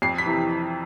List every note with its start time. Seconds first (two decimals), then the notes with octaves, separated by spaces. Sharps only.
0.02 F2 C7
0.18 B6
0.26 C3 E3